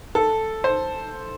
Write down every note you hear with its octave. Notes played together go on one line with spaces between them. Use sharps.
A4
C5